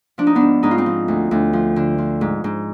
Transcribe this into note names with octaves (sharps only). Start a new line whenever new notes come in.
F3 D4
D#4
B3 D4
G#2
G#2 D#4
F4
C4 D#4
F3
D2
D2
F3
D3
F3
G#2
G#2